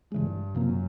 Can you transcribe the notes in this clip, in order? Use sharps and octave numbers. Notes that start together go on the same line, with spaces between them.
G2 C#3 E3 G#3
F#2 C3 F3 A#3